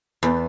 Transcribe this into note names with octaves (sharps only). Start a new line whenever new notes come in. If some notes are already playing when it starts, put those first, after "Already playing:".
E2